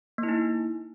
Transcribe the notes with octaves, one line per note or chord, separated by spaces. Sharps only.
A#3
E4
D#4